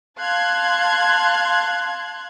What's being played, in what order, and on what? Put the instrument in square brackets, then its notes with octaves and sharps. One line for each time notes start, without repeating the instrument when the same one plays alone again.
[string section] F5 A5 C6 F#6 G#6